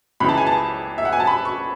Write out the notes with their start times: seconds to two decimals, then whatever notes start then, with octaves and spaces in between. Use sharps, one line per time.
0.20 C#2 C#3 E3 B5
0.29 A5
0.38 G#5
0.47 A5
0.98 E5
1.05 F#5
1.13 G#5
1.20 A5
1.27 B5
1.45 C#6